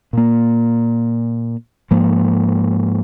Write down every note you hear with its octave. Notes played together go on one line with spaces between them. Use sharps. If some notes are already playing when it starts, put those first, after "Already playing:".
A#2 A#3
G#2 F3 A#3